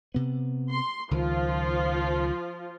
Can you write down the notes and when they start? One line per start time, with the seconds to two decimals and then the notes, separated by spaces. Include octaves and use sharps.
0.14 C3 B3
0.70 C6
1.11 C#2 D#3 F3 F4